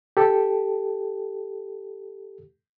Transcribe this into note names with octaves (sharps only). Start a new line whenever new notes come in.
G4 A4